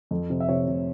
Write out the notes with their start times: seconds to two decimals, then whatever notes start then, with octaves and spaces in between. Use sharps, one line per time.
0.11 F2
0.30 C3
0.40 E5
0.49 C3 C#5
0.68 C3